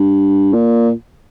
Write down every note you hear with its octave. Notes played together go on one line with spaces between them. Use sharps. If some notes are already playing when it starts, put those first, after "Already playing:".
Already playing: G2
A#2